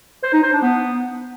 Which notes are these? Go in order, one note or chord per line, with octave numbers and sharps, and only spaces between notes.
C5
D#4
C5
D4
B3